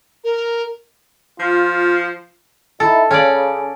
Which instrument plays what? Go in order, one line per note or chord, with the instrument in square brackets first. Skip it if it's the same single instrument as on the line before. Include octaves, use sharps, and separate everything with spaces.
[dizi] A#4
[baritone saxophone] F3 [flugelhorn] F4
[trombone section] D#4 E4 [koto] A4
[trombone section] C#3 [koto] C#4 D5